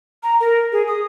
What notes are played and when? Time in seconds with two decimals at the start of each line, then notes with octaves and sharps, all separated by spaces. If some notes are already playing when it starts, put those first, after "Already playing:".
0.23 A#5
0.40 A#4
0.72 G#4
0.88 D#6